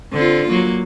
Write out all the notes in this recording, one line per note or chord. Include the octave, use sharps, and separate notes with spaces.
D3 C4 F4
F#3 A#3